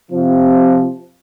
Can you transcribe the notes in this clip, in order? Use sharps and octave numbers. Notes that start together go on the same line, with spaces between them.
C3 F3